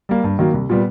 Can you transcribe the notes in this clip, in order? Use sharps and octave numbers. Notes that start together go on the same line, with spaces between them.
G3 A#3
G2
D#3 F#3 A#3
C2
A#2 G3 B3